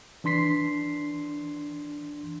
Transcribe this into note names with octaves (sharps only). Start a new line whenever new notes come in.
E3 D4 C6 B6 C7